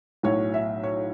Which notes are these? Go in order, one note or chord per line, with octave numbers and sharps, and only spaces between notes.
B1 A2 F#3 C#5
E5
C#5